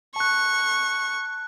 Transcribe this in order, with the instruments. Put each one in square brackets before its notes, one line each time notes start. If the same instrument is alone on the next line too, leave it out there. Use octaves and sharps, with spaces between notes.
[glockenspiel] A5 F#6 [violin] C#6